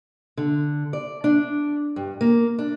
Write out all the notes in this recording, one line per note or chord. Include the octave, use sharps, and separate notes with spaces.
D3
D5
D4
G2
A#3
D4